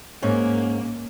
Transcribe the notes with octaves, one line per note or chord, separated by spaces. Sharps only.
G#2 A#3 C#4